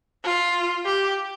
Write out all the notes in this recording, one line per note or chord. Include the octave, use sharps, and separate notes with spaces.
F4
G4